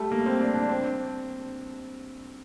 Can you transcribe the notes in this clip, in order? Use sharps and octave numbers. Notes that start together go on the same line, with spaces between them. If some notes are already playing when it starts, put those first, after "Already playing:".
Already playing: G3 A3
A#3
C4
D4
D4
C4